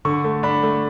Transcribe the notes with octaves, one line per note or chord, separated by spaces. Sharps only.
D3 C#6
A3
D4 B5
A3